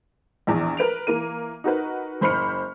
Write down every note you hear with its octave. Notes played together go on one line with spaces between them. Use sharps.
A#1 E2
A#4 B4 D7 F7
E3 A#3 A#4 D#7
D#4 F#4 A#4 B4
F#1 C5 B5 F6 C#7